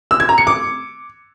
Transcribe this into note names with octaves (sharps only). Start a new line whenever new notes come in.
E6
G#6
A#5
C#7
D6